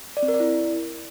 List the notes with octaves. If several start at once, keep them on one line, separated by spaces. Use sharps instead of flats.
D5
C4
A#4
D5
E4